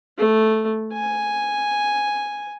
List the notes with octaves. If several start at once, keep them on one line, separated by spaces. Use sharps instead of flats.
A3
G#5